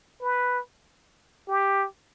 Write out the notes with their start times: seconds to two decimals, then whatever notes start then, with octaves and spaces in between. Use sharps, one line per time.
0.21 B4
1.48 G4